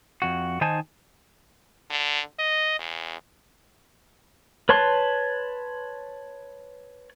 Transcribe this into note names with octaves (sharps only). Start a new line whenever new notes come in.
F2 F#4
D#3 D#4 C5 G#5 A5
D3
D#5
E2
B4 C#5 A5 C6 F#6